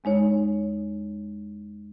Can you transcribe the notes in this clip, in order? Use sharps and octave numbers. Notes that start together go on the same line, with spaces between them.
E2 G#3 D#4 C#5